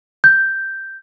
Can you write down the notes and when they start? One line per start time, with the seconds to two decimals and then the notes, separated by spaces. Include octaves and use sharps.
0.24 G6